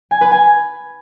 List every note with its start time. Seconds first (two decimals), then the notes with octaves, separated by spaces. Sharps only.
0.11 G#5
0.21 B4
0.31 G#5